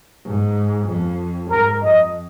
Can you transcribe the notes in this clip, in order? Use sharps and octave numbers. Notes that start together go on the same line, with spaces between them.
G#2
F2
G#2 A#4
F2 D#5